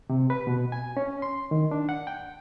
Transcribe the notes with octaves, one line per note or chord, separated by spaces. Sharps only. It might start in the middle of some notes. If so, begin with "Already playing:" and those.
C3
B4
B2
G#5
C#4
C6
D#3
D4
F#5
G5